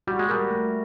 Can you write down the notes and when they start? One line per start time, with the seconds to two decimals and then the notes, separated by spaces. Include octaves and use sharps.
0.07 G3 F#4
0.19 G#3
0.29 G3 A#4
0.51 A3